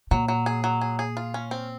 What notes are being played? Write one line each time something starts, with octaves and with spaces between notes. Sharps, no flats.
A#2 F#3
F#3
G#4
F#3
G#4
G#4
F4
C#4
C4